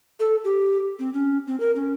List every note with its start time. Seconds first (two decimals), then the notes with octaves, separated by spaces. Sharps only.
0.20 A4
0.44 G4
0.99 C4
1.13 C#4
1.47 C4
1.60 A#4
1.76 C#4